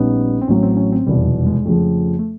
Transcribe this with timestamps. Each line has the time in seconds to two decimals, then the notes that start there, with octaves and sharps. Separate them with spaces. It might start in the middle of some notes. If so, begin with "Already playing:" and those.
Already playing: A#1 A#2 G3 B3 C#4 D#4
0.41 C4
0.47 A1 A2 F#3 C#4
0.63 C4
0.77 C#4
0.92 C4
1.06 F1 E2 B2 G3
1.26 F#3
1.40 G3
1.46 G#3
1.65 F2 C#3 F3 A3
2.19 A3